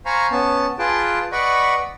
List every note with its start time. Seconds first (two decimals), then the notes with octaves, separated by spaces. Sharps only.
0.06 C5 F5 G#5 A#5 B5 C#6
0.31 B3 C#4 A5
0.79 F4 G#4 B4 G5 A5
1.32 B4 D5 D#5 F#5 B5 C#6